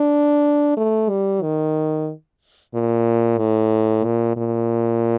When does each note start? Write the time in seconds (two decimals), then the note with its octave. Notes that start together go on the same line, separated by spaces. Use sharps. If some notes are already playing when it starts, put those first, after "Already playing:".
Already playing: D4
0.77 A3
1.09 G3
1.42 D#3
2.74 A#2
3.38 A2
4.04 A#2
4.36 A#2